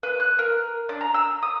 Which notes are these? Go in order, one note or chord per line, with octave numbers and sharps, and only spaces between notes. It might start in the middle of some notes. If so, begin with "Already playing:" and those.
B4
F#6
A#4
D4
A#5
E6
D#6